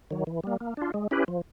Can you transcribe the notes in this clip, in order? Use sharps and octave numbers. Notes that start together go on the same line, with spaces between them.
D#3 F#3
E3
G3 A#3
A#3
D4 F4
G#3
C#4 E4 G4 B4
F3